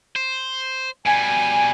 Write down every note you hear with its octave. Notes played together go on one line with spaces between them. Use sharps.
C5
B2 G3 G#5